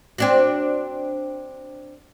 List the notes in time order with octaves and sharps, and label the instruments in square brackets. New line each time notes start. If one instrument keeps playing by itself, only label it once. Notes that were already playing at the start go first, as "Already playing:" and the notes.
[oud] C4 D4 F#4